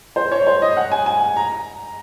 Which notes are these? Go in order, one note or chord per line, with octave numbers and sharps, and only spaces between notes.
C5
C#5
C5
D#5
F#5
G#5
G#5
A#5